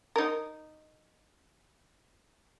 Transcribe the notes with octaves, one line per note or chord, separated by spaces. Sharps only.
D#4 A#4